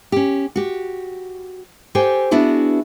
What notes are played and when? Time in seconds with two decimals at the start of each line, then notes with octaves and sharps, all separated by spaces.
0.12 C#4 G4
0.56 F#4 G4
1.95 G4 A4 C5 G5 G#5
2.31 B3 D4 E4 F#4 G#4